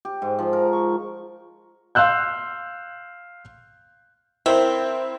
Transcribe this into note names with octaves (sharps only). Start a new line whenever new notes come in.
G4
G#2
F3
A#4
C#6
F5 C6 E6 F#6 G6
C4 E4 A#4 C5